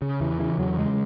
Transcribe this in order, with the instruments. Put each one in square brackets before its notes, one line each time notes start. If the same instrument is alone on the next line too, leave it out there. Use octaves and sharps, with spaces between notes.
[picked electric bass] C#3
E2 E3
C#3 E3
E2 F#3
C#3 G#3